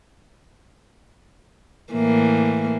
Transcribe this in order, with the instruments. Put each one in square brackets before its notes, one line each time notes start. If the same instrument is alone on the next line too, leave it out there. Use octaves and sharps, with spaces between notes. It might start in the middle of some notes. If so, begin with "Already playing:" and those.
[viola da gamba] A2 E3 A#3